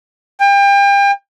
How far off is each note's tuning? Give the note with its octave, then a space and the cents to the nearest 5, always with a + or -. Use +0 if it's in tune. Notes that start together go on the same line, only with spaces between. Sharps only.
G5 +35